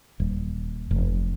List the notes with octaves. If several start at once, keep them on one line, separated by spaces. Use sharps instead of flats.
D#1
F1